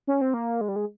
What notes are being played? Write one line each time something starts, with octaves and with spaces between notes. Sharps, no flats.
C#4
C4
A#3
G#3
G3
G#3